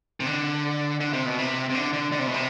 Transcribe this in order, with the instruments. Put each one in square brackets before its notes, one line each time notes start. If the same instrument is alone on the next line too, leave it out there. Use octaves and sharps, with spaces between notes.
[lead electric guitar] C3
D3
D3
C3
B2
C3
C3
D3
D3
D3
C3
B2
C3